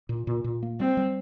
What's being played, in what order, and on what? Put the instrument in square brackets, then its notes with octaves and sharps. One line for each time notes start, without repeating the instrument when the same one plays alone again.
[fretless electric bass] A#2
A#2
A#2
A#3
[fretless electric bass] G3 [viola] C4
[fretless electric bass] G3